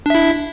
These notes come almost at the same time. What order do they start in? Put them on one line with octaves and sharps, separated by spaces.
D4 E5 E4